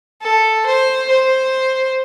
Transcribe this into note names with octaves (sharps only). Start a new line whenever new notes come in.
A4
C5
C5